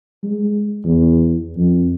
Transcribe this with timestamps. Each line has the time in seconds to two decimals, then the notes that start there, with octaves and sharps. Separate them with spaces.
0.23 G#3
0.84 E2
1.56 F2